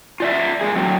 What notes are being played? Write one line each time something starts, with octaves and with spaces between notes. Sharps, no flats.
F4 D5 E5
G#3 A#3 G#4
F#3 C4